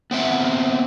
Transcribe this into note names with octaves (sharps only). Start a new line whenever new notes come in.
B3 C4 E5 F#5